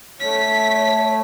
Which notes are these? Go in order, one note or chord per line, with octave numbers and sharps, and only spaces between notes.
A3 C#5 B6